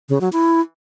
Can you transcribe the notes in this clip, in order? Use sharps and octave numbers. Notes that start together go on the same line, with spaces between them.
C#3
F#3
E4